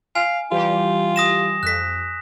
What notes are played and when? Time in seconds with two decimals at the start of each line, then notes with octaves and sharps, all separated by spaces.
0.15 F5 G#5
0.52 E3 G3 F4 G4
1.16 D#6 A#6 E7
1.63 F2 F#6 B6